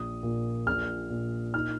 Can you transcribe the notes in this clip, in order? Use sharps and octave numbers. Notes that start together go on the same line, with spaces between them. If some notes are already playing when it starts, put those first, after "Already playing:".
Already playing: A#1 D#6
A#2
A#1 F6
A#2
D#4 F6